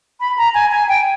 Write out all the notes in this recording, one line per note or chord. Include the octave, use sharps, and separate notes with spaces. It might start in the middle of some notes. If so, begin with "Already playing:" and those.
B5
A#5
G#5
G#5
G5